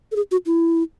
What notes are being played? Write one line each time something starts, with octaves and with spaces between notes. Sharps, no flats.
A4
G#4
F#4
E4